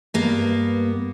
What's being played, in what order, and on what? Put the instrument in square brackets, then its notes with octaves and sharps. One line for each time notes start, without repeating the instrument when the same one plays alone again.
[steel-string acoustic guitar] G2 A#3 B3